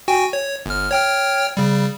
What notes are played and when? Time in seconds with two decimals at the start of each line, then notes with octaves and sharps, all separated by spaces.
0.08 F#4 G5 G#5
0.33 C#5
0.66 G1 F6
0.91 C#5 G5 F6
1.57 C#3 G3